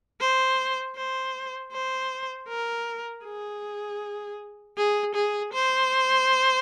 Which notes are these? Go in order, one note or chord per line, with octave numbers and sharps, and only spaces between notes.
C5
C5
C5
A#4
G#4
G#4
G#4
C5